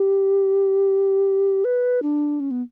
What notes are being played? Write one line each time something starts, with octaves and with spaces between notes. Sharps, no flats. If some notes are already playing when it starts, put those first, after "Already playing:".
Already playing: G4
B4
D4
C#4
B3